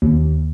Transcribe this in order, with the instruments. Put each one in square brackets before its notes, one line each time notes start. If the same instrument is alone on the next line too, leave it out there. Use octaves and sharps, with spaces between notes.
[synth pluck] D#2